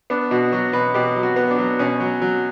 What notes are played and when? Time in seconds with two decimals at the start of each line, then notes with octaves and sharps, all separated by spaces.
0.10 B3 D4
0.31 B2 F#4
0.52 F#3 F#4
0.73 B2 B4
0.94 B2 G4
1.16 F#3
1.23 F#4
1.36 B3
1.51 D4
1.58 F#3
1.79 B2 C#4
2.00 F#3
2.22 F#3